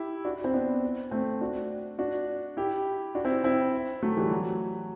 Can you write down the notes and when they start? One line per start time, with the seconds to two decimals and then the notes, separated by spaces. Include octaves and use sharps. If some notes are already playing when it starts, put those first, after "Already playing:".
Already playing: E4 G4
0.25 D4 F#4
0.44 C4 E4
0.54 B3 D4
1.11 A3 C4
1.41 D4 F#4
1.99 D4 F#4
2.57 E4 G4
3.15 D4 F#4
3.25 C4 E4
3.44 C4 E4
4.02 F#3 A3
4.17 E3 G3
4.31 F#3